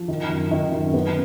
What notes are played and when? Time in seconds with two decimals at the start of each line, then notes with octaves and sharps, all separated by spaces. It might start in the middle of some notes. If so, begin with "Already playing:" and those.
Already playing: F3
0.08 D#3
0.30 F#2
0.51 D#3
0.72 F#2
0.94 B3